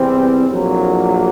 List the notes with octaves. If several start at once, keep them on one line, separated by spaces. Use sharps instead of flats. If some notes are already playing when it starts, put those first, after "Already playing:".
Already playing: E2 C3 E3 G3 C4
A#1 A2 F#3 A#3